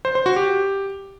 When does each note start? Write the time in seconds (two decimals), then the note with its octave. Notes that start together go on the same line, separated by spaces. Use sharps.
0.05 C5
0.15 C5
0.26 F#4
0.36 G4